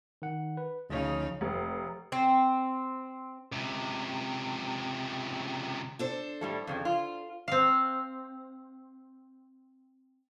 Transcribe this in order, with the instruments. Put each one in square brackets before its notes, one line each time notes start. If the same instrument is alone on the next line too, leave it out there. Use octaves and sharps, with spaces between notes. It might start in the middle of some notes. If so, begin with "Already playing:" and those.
[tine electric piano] D#3 F#5
B4
[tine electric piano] D2 C#5 [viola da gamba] C#3 F3 D#4
[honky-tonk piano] F1
[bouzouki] C4
[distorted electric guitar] C#2 C3
[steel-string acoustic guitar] D4 A4 C5
[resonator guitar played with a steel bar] A2 G3 A3
F2 C#3 F3
F4
[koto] C4 F5